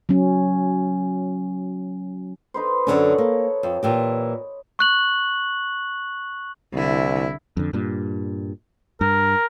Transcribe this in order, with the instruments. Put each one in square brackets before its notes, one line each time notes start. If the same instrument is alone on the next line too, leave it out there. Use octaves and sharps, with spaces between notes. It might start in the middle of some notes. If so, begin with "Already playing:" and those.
[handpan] F#3 C#4
[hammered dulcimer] D#4 B4 C5
[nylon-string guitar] F#2 D3 C#4 [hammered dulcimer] A4 C#5
[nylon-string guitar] A#3
F2
A#2 E3 G4
[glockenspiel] C#6 F#6 F#7
[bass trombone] C2 [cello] D3 E4
[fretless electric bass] F2 D3
G2 A#2
[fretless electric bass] G2 [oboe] A#4